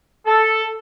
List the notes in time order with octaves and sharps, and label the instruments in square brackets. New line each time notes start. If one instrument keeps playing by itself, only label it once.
[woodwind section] A4